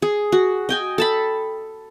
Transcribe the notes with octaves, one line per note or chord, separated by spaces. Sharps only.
G#4
F#4
D#5 G5 G#5
A4 A5 B5